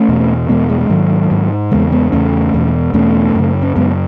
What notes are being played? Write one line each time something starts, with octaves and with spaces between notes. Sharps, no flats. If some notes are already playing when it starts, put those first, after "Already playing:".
Already playing: A3 C#4
E2 B2
E2 B2 G#3 B3
E3 G#3
G#3
G#2 D#3 F#3
G#2
E2 C#3 G#3 B3
G#3 B3
E2 C#3 A3 C#4
E2 B2
E2 B2 A3 C#4
F#2 C#3
C#4
F#2 C#3 G#3 B3